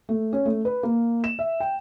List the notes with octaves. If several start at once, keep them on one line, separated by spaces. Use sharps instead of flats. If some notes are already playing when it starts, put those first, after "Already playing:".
A3
C#4
A3
B4
A#3
E7
E5
G5